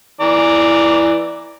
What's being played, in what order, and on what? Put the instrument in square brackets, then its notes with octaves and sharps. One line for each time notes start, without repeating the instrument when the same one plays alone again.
[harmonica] E3 D5 A#5